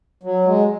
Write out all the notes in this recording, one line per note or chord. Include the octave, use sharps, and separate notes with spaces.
F#3
G#3